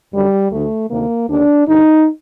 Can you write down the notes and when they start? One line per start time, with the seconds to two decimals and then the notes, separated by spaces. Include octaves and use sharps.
0.12 F#2 D3 G3
0.51 D2 D3 A3
0.90 D2 C3 D#3 A#3
1.29 D#2 D3 D4
1.67 G2 D3 D#4